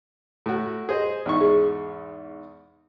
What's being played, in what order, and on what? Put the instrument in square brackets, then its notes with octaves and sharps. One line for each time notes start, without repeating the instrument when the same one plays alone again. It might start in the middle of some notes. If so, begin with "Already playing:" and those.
[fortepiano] A2 F#4
G#4 C5 D#5
E2 G#2 C#6
[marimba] G#4